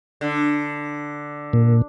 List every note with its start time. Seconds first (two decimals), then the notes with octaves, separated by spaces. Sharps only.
0.21 D3
1.53 A#2